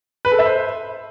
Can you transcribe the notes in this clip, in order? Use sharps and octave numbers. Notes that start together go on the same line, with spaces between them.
B4
A4
E5
C5